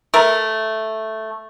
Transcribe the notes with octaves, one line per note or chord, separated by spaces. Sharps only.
A3 A#4